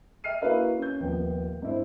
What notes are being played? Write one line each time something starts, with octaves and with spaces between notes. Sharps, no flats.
E5 G5 F6 C7 D#7
A#3 E4 F#4 B4 E5 F5
C#4 G6
D#1 F3 B3 G5
G2 E4 C5